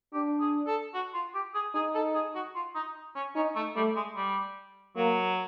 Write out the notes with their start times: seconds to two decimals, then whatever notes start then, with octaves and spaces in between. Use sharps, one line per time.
0.13 D4 G4
0.40 G#4
0.67 A4
0.94 F#4
1.14 F4
1.34 G4
1.54 G#4
1.74 D#4 G#4
1.95 A4
2.14 G#4
2.35 F#4
2.55 F4
2.75 D#4
3.15 C#4
3.35 C#4 D#4
3.55 A3
3.75 G3 A3
3.96 G#3
4.16 G3
4.96 F#3 A#3